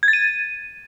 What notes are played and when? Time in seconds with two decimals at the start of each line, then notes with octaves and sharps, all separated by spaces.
0.03 G#6
0.08 A6
0.13 D#7